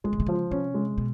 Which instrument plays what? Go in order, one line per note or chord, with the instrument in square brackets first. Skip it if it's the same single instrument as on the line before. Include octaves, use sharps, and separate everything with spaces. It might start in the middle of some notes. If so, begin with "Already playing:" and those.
[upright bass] D3 [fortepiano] G#3
[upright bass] C#3
C3
[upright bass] C#3 [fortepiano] F3
[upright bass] C3 [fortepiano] C#4
[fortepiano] G#3
[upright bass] B2